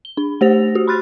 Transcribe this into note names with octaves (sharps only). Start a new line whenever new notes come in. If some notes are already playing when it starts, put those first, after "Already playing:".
G7
D4
A3 G4 C5 A#6 F7
F#4 G4
B5 C6 F6 F#6 A6